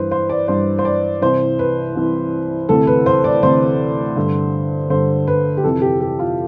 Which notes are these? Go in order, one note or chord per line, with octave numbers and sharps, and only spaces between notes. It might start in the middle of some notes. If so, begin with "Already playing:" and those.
Already playing: G2 E3 B4 C5
C5
D5
G2 E3 C5
C5
D5
C2 C3 E3 C5
B4
C2 C3 E3
D2 C3 E3 A4
B4
C5
D5
D2 C3 E3 C5
G2 D3
G2 D3 C5
B4
G4
F2 C3 E3 A4
G4
G4
F4